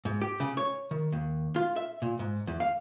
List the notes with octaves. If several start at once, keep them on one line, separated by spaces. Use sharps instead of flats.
G#2
G4
C#3
C#5
D#3
D#2
F4
E5
A#2
G#2
E2
F5